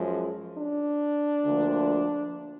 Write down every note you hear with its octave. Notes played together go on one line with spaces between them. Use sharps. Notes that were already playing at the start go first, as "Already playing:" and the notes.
Already playing: F#2 F3 G#3
D4
D2 D3 F3 A#3